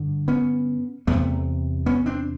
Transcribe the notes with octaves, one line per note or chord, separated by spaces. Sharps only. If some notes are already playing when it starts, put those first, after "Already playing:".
Already playing: G2 D3
B3 C#4
E2 C3 A3 B3
B3 C#4
C4 D4